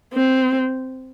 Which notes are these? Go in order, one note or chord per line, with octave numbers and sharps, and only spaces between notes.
C4